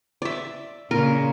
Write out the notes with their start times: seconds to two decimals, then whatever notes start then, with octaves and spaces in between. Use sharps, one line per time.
0.22 D5 E5
0.91 A#2 C#3 A#4